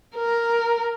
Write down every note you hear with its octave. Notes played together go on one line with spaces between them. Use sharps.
A#4